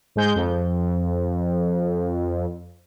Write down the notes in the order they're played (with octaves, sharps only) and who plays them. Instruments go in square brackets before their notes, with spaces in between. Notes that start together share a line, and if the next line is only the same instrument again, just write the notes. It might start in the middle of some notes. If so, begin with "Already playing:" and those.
[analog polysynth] G#2 G#3 G6
F2